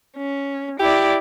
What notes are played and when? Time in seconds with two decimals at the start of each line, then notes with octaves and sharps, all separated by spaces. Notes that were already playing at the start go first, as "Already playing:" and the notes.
0.17 C#4
0.80 E4 G4 D5